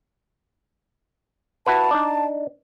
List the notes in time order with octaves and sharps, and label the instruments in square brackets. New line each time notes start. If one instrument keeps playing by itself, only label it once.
[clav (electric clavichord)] E4 F#4 B4 [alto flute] A5
[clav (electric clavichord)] D4 D#4 D5